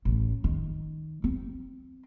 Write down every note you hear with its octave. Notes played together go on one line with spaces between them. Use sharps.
A1
D#3
C4